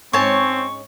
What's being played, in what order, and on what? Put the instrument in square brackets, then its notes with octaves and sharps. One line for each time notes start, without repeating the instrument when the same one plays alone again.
[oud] G#2 C#4 [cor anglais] C4 [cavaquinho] C#5 G#5 A5 [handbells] C#6